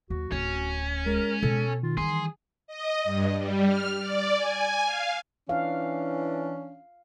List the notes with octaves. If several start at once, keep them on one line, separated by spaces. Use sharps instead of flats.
D#2 F#3 F#4
D1 C#4
G#3 A#4
B2 A4
D#3 F4
E3 G3 G#4 C6
D#5
G2
G3
F6
D5
G#5
F5
E3 C#4 D4 F5